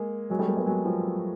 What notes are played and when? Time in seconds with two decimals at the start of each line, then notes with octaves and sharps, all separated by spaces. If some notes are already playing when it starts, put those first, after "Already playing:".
Already playing: G#3 A#3
0.30 F#3 G#3
0.39 G3 A3
0.48 G#3 A#3
0.57 A3 B3
0.66 F#3 G#3
0.85 F3 G3